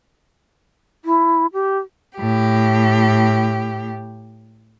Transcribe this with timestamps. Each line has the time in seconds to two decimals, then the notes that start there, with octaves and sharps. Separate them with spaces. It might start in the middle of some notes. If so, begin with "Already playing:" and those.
1.05 E4
1.53 G4
2.19 A2 G4